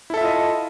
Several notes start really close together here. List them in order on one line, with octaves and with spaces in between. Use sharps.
E4 A4 E5 F4 D#5